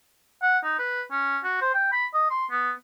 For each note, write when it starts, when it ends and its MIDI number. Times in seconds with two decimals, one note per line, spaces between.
0.42 0.58 78
0.63 0.78 63
0.79 1.02 71
1.11 1.39 61
1.44 1.57 66
1.61 1.74 72
1.74 1.91 79
1.92 2.06 83
2.14 2.30 75
2.31 2.45 84
2.51 2.72 59